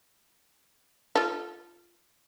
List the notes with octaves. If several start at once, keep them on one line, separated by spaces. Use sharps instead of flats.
F4 A4